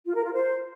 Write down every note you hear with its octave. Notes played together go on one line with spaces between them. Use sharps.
F4
A#4
F4
C5